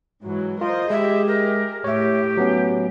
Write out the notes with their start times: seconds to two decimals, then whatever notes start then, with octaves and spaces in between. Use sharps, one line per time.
0.24 G#2 E3 F#3
0.61 F4 A#4 C5 D#5
0.90 G#3 G4 G#4 E5
1.27 A#4
1.84 A2 G4 C#5 E5
2.37 F#3 B3 C#4